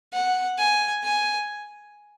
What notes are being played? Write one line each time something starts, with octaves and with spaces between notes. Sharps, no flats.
F#5
G#5
G#5